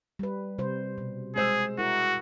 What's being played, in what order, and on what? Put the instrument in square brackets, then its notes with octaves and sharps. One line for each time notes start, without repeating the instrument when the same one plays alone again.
[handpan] G3 B4
C3 G3 C5
B2
[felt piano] G#3 C5 E6 [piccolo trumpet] G#4
[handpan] E4 A#4 [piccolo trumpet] F#4